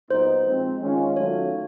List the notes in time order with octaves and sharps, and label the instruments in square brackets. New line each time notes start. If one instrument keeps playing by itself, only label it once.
[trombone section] A#2 F#3 B3 D#4 [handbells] C5
[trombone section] F3 G#3 C4
D#3 G#3 C#4 F4
[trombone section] D#3 F#3 A3 C#4 F4 [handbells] C#5